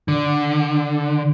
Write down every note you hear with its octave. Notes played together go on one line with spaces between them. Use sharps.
D3